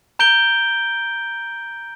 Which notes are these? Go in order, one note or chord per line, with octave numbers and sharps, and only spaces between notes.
A#5 G6 D7 G7